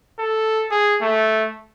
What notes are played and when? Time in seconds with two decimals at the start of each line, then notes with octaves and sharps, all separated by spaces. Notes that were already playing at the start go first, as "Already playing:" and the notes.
0.19 A4
0.71 G#4
1.02 A3